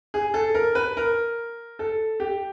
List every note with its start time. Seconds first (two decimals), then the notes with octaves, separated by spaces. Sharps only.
0.14 G#4
0.34 A4
0.55 A#4
0.75 B4
0.97 A#4
1.79 A4
2.20 G4